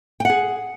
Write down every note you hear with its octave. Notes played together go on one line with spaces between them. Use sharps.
G#4 F#5 G5